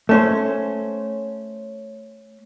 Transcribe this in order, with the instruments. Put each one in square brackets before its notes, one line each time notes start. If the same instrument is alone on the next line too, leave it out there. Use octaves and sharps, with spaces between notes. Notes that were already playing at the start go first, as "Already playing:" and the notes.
[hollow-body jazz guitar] A3 C#4 C5